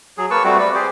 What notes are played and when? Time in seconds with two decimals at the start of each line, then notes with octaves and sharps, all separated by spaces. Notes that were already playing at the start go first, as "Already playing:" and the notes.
0.18 F#3 G#4
0.31 A#3 B4 A5 C#6
0.44 G3 A3 C4 F#4
0.59 B4 D5
0.74 G4 G#4 C5